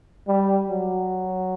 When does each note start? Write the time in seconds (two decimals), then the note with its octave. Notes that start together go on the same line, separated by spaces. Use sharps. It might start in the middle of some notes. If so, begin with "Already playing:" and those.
0.28 G3
0.69 F#3